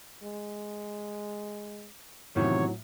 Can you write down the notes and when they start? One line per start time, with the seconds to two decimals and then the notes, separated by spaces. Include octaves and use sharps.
0.23 G#3
2.36 E2 A2 C3 D#3 F#3 C#5